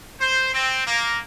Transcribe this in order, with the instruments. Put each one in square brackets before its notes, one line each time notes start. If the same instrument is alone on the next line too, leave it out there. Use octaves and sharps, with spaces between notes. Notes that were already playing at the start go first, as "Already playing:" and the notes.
[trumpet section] C5
C4
A#3